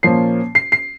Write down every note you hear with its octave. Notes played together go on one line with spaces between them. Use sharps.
A#2 F3 A#3 C#4 C7
C7
C7